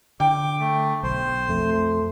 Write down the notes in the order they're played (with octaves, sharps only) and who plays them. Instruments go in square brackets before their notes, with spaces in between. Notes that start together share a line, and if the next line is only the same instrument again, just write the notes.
[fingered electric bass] D3 [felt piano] G5 [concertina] D6
[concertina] A3
[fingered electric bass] B1 [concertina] C5
[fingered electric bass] F2 [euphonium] A3